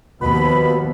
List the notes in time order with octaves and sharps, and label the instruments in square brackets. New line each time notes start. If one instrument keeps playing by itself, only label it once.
[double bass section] D#2 F3 B3 [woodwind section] B2 B5